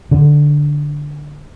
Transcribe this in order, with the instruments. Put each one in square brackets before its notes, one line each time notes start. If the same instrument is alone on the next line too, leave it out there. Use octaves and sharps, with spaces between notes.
[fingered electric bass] D3